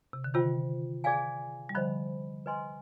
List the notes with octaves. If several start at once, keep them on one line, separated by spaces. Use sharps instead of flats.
C3
D3
C3 D#3 F4 C5 G5
G#4 D5 F5 G#5
G3
D3 F3 C5 D#5 B5
B4 D#5 G#5 C6